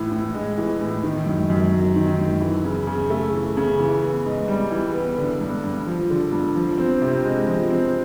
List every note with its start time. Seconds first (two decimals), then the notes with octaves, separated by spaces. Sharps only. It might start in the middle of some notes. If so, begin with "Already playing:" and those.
Already playing: A2 E3
0.12 A2
0.34 G#3
0.58 E3
0.81 A2
1.04 D#3
1.26 F#2
1.50 F#2
1.72 F#3
1.96 D#3
2.18 F#2
2.41 E3
2.64 C#3
2.87 C#3
3.10 A3
3.33 E3
3.57 C#3
3.79 E3
4.02 B3
4.26 G#2
4.48 G3
4.71 E3
4.94 B3
5.17 D3
5.41 G2
5.64 G2
5.86 F3
6.10 D3
6.32 G2
6.55 F3
6.78 C4
7.02 C3
7.25 G#3
7.47 F3
7.71 C4